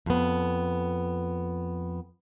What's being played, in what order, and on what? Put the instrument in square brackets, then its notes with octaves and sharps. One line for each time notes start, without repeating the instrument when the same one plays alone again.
[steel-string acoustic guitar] F2 B3